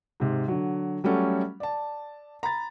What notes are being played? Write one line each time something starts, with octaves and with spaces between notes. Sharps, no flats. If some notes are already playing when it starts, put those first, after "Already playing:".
G#2 C3
D3 F#3
F#3 G3 A3 C#4 F#4 A4
D5 A5
A#5 B5 A6